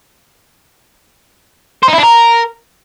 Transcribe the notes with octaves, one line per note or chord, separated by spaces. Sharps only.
C5
D#4
E4
D4
A#4